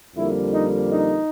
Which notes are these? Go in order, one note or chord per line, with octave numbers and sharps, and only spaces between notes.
F2 D3 G3 A#3 E4
D#4
D#4